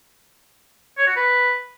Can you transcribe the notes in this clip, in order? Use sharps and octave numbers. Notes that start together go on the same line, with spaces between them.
C#5
F#4
B4